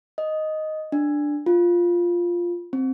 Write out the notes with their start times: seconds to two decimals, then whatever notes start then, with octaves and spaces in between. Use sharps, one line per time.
0.18 D#5
0.92 D4
1.46 F4
2.73 C4